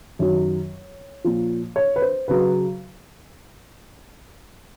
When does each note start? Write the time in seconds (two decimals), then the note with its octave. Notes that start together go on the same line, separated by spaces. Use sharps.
0.19 F#2 D#3 F#3 C#5
1.24 A#2 F3
1.76 C#5
1.96 B4
2.02 C5
2.28 C#3 F#3 B4